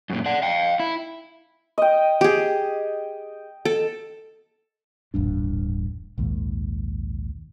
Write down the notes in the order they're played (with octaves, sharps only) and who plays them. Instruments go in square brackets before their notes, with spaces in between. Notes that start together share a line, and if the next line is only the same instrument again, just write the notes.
[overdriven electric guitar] F#2 A#2
D5 F#5
F5 G5
E4
[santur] D#5 G5
[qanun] G4 G#4
A4
[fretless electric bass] D#1 A1 G2 D4
A#1 D#2 G#2